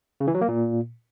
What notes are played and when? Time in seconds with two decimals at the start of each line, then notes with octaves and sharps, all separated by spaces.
0.20 C#3
0.27 E3
0.34 F#3
0.41 A#3
0.48 A#2